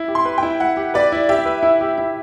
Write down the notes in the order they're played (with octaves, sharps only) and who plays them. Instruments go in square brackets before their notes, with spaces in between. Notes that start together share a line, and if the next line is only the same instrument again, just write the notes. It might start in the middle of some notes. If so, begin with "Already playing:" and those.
Already playing: [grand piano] E4
G4
[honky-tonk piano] C6
[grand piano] B4
[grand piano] E4 [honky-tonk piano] G5
[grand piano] E4 [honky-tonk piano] F#5
[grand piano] G4
[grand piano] B4 [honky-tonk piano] D5
[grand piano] E4
[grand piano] G4 [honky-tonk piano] E5
[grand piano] B4
E4
G4
E4